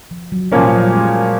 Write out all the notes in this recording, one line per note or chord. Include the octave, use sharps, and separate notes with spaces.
F3
F#3
A#2 F3 G3 A#3 C#4
F#3
G3
G#3